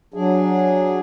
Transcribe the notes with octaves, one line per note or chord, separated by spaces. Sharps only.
F#3 D4 G#4